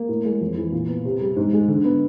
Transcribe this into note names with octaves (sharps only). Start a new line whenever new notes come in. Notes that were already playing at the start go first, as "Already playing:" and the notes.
Already playing: A#3
A2
G#3
F2
E3
A#2
B3
C3
G3
G#2
G#3
D3
B3